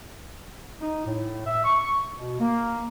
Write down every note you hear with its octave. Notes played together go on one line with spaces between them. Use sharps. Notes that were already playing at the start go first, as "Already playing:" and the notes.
D#4
A2
E5
C#6
B2
A#3